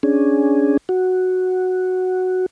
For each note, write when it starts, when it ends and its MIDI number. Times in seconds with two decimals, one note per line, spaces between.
0.03 0.77 61
0.03 0.77 62
0.03 0.77 68
0.89 2.46 66